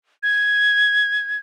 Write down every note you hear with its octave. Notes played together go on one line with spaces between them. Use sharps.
G#6